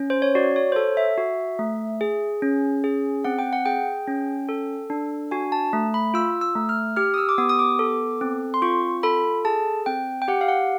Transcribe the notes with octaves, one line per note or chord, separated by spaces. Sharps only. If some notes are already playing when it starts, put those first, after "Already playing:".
Already playing: C#4
C5
C#5
F#4 D5
C#5
C5
A4 C#5
E5
F#4
A3
G#4
C#4
G#4
C4 F#5
G5
F#5
G#4 G5
C#4
A4
D4
F#4 G#5
A5
A3
B5
F4 E6
E6
A3
F6
G4 F6
D#6
E6
D6
B3 D#6
D#6
D6
A4
C4
C6
F4 C#6
A4 B5
G#4 A5
C4 G5
G5
G4 F#5
F5
F#5